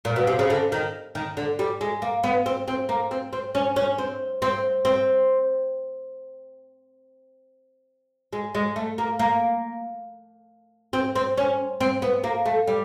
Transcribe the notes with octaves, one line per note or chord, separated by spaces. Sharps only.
A#2
B2
C3
C#3
D3
D#3
D#3
D3
G3
G#3
A#3
B3
C4
C4
A#3
C4
C4
C#4
C#4
C4
C4
C4
G#3
G#3
A3
A#3
A#3
C4
C4
C#4
C4
B3
A#3
A3
G3